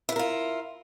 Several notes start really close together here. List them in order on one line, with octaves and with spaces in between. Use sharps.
E4 B4 A#4 F4